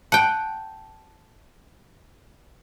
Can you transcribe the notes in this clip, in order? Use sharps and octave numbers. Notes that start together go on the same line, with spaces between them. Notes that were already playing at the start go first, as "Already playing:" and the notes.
F#5 G5 A5